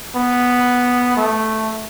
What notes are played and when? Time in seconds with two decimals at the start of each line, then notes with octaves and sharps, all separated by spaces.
0.16 B3
1.17 A3